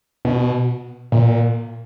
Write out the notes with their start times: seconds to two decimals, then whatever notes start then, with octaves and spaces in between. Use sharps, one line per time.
0.25 B2
1.12 A#2